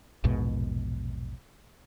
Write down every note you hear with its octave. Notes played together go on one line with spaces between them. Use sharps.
A#1 E2 G#2 B2